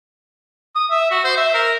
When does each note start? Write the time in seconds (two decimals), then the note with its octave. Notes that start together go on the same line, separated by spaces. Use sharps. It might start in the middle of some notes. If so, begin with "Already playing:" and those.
0.75 D#6
0.91 E5
1.11 F#4
1.24 C5
1.37 E5
1.54 A#4